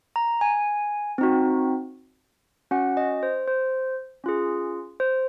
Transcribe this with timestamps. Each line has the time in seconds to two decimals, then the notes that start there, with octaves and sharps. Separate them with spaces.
0.16 A#5
0.41 G#5
1.18 C4 D#4 F#4
2.71 C#4 F#4 F#5
2.97 D#5
3.23 C5
3.48 C5
4.24 C#4 F4 G#4
5.00 C5